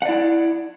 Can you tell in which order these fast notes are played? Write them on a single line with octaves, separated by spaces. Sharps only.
F#5 D5 E4